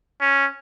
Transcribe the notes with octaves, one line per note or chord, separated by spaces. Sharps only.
C#4